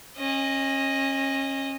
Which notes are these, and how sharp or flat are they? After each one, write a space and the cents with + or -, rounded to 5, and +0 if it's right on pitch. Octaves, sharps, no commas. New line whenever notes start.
C#4 -30 D#5 +0